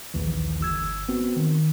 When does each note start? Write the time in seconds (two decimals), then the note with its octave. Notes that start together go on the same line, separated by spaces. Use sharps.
0.14 A#1 D#2 E3
0.61 G1 E6 G#6
1.09 B3 C4 F#4
1.36 D#3